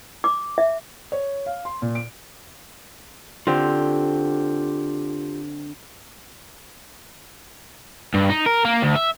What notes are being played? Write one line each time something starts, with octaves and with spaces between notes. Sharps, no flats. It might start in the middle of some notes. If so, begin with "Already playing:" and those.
D6
E5
C#5
F5
C6
A#2
D7
D3 C4 F4 G4
G2
D#4
A#4
A#3
D2
E5